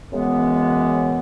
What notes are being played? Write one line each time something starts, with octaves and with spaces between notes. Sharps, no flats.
F#2 C#3 E3 G#3 B3